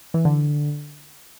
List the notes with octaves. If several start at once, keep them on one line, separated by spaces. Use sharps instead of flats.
E3
D3